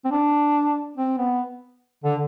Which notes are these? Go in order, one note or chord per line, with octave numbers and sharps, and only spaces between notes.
C4
D4
C4
B3
D3